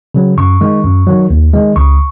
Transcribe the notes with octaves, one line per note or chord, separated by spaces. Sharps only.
C#3 F#3
F#2 C#6
D#3 G#3
F#2
D#3 F#3
D#2
D#3 G#3
C#2 C#6